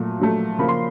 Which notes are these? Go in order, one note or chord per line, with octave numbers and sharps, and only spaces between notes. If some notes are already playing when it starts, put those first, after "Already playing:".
Already playing: A#2 F#3 A3
A#2 F#3 A3
C#3 F3 A#3 B5
C6